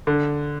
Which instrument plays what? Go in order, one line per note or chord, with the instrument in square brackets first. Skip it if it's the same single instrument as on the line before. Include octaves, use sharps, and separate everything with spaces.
[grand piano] D3